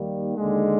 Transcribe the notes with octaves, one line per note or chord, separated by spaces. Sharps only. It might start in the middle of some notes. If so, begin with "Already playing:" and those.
Already playing: D#2 D#3 G3 A#3
D#2 D3 G#3